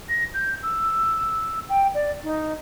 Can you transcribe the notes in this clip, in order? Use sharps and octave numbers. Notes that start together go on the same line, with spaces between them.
A#6
G6
E6
G5
D5
D#4